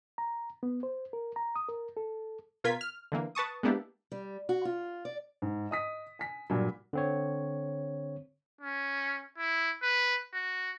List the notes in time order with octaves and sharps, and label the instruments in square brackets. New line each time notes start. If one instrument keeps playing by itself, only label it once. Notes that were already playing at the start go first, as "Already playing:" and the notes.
[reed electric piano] A#5
B3
C5
A#4
A#5
D#6
A#4
A4
[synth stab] B2 F4 A#4 G#6 B6
F6
D3 E3 A#3
B4 A5 C#6 D#6
G#3 A#3 B3 D4 E4 G4
[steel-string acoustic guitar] G3
F#4
F4
D5
[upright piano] G#2
D#5 D#6 B6
G#5 B6
G2 A#2 F#3
[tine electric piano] D3 C4 C#5
[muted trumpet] C#4
E4
B4
F#4